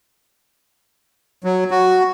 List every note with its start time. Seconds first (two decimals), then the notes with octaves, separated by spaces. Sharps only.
1.44 F#3
1.71 F#4